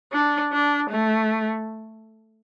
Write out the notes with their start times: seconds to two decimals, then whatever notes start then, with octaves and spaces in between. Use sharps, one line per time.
0.12 D4
0.52 D4
0.90 A3